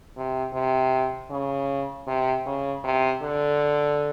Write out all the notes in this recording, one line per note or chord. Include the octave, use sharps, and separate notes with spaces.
C3
C3
C#3
C3
C#3
C3
D3